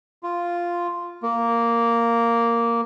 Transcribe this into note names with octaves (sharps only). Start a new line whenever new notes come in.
F4
A#3